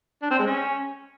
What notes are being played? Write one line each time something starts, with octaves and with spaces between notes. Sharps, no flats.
D4
C4
G#3
C#4